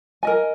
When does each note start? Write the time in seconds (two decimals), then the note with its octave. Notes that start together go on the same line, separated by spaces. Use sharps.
0.23 A#4 D#5 G#5